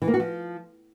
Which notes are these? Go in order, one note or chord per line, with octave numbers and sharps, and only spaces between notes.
E3
A#3
F#4
F3